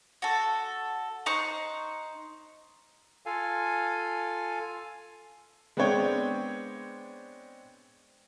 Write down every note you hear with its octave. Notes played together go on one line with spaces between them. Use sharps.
F#4 A4
D#4 C5 C#6 F#6
F4 A4 F5 G#5
G#3 B3 C4 D4 C#5 G5